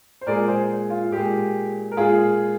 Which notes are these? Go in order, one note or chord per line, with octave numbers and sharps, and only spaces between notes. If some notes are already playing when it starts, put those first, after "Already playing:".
C5
A#2 G#3 A#4 D5
G#4 C5
F4
A#2 G#3 G4
A#4
A#2 G#3 F4 G#4